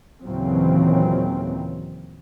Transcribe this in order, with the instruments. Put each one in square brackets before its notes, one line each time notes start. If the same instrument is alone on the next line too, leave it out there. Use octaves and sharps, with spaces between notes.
[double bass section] D#2 A#2 C#3 E3 F#3 C4